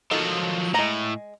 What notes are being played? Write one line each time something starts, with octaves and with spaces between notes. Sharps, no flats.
D#3 F3 F#3 A4
A2 G#3 A#5